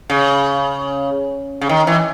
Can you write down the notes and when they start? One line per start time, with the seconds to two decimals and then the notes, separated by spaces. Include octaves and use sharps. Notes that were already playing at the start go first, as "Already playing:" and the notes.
0.10 C#3
1.61 C#3
1.69 D#3
1.87 E3